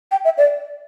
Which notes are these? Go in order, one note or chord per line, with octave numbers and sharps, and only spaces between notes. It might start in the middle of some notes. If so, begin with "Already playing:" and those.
G5
E5
D5